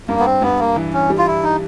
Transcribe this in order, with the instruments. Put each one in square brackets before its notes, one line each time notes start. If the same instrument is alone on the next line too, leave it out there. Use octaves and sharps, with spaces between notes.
[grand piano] G2 [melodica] A#3
[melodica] B3
C4
[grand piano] G2 [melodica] B3
[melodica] A#3
[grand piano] E3
[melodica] C#4
[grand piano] G3
[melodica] F4
E4
D#4